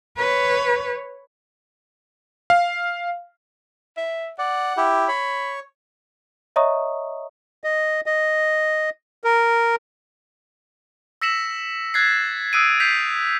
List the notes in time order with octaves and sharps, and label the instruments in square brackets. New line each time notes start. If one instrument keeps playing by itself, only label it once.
[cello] B4 C#5
[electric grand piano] F5
[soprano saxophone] E5
[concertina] D5 [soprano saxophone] F#5
[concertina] E4 G4
[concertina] C#5 [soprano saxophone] B5
[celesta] C#5 D#5 E5 A#5 C#6 D#6
[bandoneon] D#5
D#5
A#4
[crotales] E6 A#6 B6 C#7 E7 F#7
F#6 G#6 A6 B6 C7
D#6 E6 F#6 C7 D7 D#7
G6 B6 C7 F7